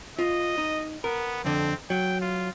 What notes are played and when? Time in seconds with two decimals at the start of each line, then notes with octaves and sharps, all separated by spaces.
0.19 F4 D#5
0.58 D#4
1.04 B3 A#4
1.45 F2 D3 C4
1.90 F#3 G5
2.21 F4